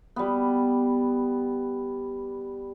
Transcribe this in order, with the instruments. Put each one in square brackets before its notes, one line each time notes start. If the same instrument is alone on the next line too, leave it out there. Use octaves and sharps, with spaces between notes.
[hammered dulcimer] G3 B3